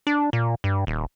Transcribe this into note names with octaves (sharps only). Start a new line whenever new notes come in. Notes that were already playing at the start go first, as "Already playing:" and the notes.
D4
A#2
G2
D#1